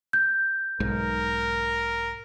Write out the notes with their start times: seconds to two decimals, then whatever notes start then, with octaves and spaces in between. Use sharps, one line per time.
0.13 G6
0.80 B1 G#2 A#4